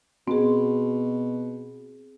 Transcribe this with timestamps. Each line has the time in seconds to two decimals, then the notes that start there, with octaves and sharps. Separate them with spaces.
0.28 B2 C4 G#4